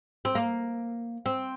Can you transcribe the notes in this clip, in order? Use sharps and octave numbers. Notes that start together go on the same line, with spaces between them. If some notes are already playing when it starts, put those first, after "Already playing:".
C4
A#3
C4